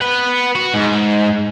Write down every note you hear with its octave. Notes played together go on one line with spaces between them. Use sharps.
B4 F#5
F#4
G#2